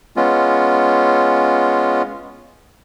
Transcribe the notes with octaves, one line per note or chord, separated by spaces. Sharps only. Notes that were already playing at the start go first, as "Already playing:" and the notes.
G#3 B3 C#4 F4